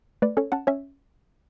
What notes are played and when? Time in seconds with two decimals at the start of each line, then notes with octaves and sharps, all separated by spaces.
0.22 A3 B4 D5
0.37 C#4 A4 C#5
0.52 C#4 F#5 A5
0.67 C#4 C#5 E5